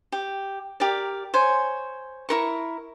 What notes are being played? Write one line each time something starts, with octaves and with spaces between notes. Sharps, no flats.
G4
G4 A#4 D5
C5 C#5 G#5
E4 A#4 C#6